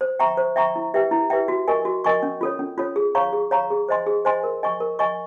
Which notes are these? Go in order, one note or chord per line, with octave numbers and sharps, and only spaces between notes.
C5
E5 G5 A#5 C#6
C5
E5 G5 A#5 C#6
E4
G4 B4 E5 G5
E4
G4 B4 E5 G5
F#4
A#4 D#5 G#5 C#6
F#4
A#4 D#5 G#5 C#6
C#4
F4 A4 C#5
C#4
F4 A4 C#5
G#4
C#5 F5 A#5 C#6
G#4
C#5 F5 A#5 C#6
G#4
C5 D#5 G#5 C6
G#4
C5 D#5 G#5 C6
A#4
D#5 G#5 C#6
A#4
D#5 G#5 C#6